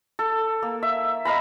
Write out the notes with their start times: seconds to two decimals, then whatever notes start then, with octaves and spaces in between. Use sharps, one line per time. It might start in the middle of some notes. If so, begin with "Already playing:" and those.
0.19 A4
0.62 A#3
0.83 E5
1.25 D#5 F5 A#5 B5